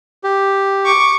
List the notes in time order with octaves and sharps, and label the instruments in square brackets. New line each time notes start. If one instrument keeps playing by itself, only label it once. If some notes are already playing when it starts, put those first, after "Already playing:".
[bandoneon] G4
[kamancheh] C#6 D6